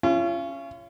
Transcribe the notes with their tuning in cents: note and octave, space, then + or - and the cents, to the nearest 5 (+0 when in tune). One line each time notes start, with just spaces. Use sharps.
C#4 +0 F4 -40